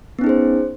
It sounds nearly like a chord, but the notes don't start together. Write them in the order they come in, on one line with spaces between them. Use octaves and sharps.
B3 C#4 D#4 G#4 C5